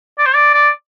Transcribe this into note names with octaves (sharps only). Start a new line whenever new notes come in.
D5
C5
D5
D5